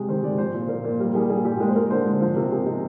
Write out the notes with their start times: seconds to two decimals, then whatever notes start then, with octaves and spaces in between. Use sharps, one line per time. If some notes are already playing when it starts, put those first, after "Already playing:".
Already playing: C3 G#3 G4 G#4
0.08 D#3 C5
0.23 G#3 D5
0.38 F3 C5
0.54 A#2
0.69 A#2 A#4
0.84 A#2
1.00 G3 A#4
1.14 G3 G#4
1.30 A#2 G#4
1.45 A#2 G4
1.60 G#3 A#4
1.68 C5
1.76 G#3 A#4
1.90 D3 C5
2.06 G#3
2.20 F3 C5
2.36 C3 A#4
2.51 C3 G#4
2.66 C3 D#4